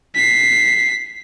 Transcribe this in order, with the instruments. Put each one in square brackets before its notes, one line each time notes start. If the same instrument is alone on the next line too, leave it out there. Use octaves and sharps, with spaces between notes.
[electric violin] B6 C7